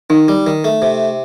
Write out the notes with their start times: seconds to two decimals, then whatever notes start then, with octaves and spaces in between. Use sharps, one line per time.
0.10 D#3 D#4
0.28 G3
0.47 D#3
0.64 A3
0.82 C3